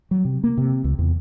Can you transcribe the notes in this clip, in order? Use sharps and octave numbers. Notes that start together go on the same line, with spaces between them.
F#3
C3
A#3
C3
C#2
E2